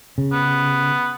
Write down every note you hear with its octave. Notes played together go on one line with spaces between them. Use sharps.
C#3
B3